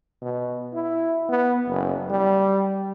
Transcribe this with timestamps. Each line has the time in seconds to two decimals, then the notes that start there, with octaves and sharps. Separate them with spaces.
0.22 B2
0.74 E4
1.29 B3
1.68 F#1
2.10 G3